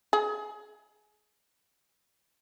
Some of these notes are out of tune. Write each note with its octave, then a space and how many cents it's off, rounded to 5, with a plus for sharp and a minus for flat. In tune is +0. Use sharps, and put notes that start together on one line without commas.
G#4 +20